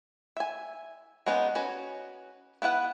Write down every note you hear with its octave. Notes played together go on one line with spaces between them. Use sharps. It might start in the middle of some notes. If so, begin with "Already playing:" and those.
E5 G#5
G#3 A#3 B3 C#4 D#4
C#4 F#4 B4 C#5
B3 E4 B4 F#5